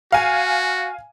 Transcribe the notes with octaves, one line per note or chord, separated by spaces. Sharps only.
F#4 F5 G#5